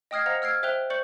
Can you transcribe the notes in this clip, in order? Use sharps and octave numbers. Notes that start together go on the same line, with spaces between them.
D#5 G5 D#6 F6 G#6 C7
C5 D#5 F5 F#5 A#5 F7
E6 F6 G#6 C7 D7
C5 E5 G5 F#6 F7 G7
C5 D5 C#6 G6 C#7 F#7